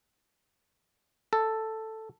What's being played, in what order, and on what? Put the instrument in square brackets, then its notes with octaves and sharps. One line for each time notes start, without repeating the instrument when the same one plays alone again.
[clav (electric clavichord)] A4